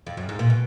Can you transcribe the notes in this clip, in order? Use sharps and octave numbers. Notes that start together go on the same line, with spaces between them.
F2
F#2
G#2
A#2
B2